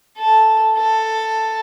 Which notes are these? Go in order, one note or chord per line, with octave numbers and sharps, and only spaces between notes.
A4
A4